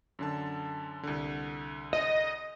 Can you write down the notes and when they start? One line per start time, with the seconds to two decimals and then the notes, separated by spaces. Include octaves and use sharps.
0.19 F#2 D3 A5
1.03 C2 D3
1.93 D#5